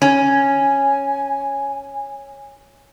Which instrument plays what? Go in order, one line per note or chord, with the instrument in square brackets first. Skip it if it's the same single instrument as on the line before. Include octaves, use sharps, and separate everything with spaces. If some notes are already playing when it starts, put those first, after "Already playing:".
[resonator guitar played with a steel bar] C#4 [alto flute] G#5